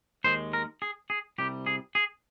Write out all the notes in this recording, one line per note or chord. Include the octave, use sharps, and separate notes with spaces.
D#2 D#3 G#3 C5
A#4
G#4
G#4
C2 C3 G3 G4
G#4
G#4